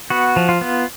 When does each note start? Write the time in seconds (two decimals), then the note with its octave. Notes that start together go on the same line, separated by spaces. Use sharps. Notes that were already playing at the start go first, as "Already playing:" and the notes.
0.10 B3 F#4
0.36 F3
0.49 F4
0.61 B3